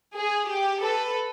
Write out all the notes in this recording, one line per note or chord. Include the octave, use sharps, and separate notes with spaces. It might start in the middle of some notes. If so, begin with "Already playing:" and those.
G#4
G4
A4 B4